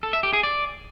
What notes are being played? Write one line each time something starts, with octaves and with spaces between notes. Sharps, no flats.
A4
E5
G4
G#4
D5